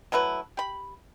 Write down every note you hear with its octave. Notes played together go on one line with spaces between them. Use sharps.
F#3 A3 E4 B4
G4 B5